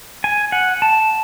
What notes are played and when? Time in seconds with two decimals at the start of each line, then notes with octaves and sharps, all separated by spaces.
0.24 G#5
0.52 F#5
0.82 A5